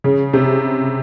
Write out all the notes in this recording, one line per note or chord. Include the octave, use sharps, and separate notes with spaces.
C#3
C3